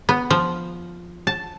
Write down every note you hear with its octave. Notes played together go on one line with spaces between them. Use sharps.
B3
F3
A5